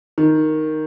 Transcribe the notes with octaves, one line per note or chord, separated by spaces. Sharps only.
D#3